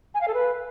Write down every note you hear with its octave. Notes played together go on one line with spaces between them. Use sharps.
G#5
F5
A4
B4